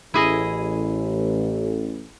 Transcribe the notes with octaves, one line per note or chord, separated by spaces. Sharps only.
A1 E4 G#4 D#5